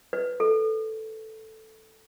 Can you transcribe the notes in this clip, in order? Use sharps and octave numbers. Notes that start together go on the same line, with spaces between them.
B4
A4